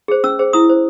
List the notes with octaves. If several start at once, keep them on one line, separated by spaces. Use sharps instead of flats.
G#4 C5
C#4 E6
G#4 C5
E4 D#6
C5